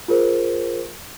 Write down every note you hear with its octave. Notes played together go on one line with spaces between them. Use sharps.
F4 G#4 A#4 C5